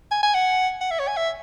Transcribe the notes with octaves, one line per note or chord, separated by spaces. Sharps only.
G#5
G#5
F#5
F#5
E5
C#5
G#5
E5